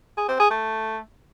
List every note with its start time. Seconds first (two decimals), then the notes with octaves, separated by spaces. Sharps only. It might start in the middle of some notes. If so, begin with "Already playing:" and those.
0.17 G#4
0.28 C4
0.39 G#4
0.50 A3